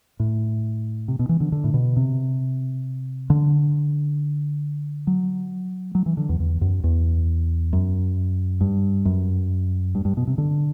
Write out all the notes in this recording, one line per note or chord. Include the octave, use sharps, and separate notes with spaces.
A2
C3
B2
E3
D3
D3
A2
B2
C3
D3
F#3
F#3
E3
D3
E2
E2
F#2
E2
F#2
G2
F#2
G2
G2
B2
C3
D3